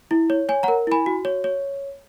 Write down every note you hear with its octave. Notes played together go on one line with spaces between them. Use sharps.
E4
C#5
C#5 G#5
F#5 A#5
A#4
E4 G#5 B5
F#4
C#5
C#5